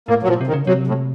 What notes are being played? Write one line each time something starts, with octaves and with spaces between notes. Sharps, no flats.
A2 A#3
F#3
A#2 F3
C3
D#3
C#3
C3 F#3
A2